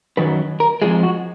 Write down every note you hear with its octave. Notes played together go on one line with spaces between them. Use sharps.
F#2 D#3 F#3 B4
A#4
F2 C#3 F3 G#3 G#4
F#4